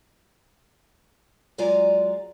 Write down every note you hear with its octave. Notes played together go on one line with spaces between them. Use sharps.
F#3 G#3 F4 D5 G#5 A#5